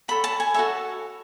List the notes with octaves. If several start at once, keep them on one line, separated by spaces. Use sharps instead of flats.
F#4 A4 C#5 B5
A5
G#5
F#4 A4 C#5 E5